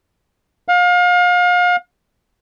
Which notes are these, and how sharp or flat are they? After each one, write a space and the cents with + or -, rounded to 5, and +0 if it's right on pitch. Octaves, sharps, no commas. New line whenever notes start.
F5 +35